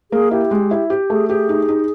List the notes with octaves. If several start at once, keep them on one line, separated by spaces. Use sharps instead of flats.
A#3 G#4
E4 G4
G#3
E4
G4
A3 G#4
G4 G#4
D#4
D#4